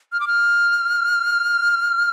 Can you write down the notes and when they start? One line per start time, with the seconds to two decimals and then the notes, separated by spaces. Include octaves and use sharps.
0.12 F6
0.20 D6
0.27 F6